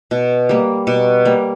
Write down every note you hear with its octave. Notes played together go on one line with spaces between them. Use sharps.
B2
G3 A#3
B2
G3 A#3